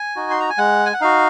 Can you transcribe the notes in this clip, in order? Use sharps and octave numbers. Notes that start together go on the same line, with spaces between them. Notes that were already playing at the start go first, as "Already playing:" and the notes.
Already playing: G#5
D#4 F#4
C6
A#5
G#5
G#3 F#5
G#5
F#5
D#4 F#4 F5